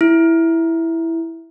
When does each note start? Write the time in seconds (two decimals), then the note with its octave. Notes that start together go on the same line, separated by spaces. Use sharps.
0.01 E4